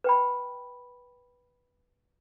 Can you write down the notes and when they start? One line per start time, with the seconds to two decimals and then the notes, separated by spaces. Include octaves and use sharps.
0.04 B4 G5 B5